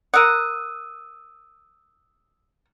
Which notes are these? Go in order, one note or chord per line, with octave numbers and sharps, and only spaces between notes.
A#4 F#5 D#6 E6 D#7